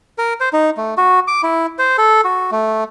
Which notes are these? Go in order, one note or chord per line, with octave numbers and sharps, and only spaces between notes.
A#4
C5
D#4
A3
F#4
D6
E4
C5
A4
F#4
A3